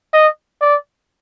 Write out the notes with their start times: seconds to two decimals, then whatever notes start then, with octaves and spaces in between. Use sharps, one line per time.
0.13 D#5
0.61 D5